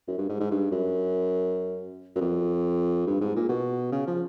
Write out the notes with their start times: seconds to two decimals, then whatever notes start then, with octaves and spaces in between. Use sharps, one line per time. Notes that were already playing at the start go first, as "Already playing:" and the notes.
0.08 F#2
0.18 G2
0.29 G#2
0.40 G#2
0.51 G2
0.72 F#2
2.16 F#2
2.21 F2
3.07 G2
3.21 G#2
3.36 A#2
3.49 B2
3.92 C#3
4.07 F3